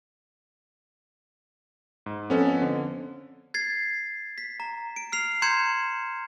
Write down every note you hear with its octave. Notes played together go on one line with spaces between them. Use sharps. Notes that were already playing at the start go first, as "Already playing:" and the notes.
G#2
F2 B3 C#4 A4
D3
G#6 A6 C7
B6
A#5
D7
F6 C7 F7
A#5 C6 G6 G#6 C#7 E7